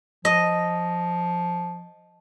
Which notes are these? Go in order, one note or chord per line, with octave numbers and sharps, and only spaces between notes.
F3 D#5